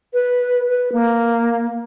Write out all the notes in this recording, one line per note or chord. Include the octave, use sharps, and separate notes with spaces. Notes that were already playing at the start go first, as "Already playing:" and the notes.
B4
B4
A#3